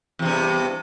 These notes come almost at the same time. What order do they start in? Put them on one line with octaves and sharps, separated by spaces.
E2 C3 G2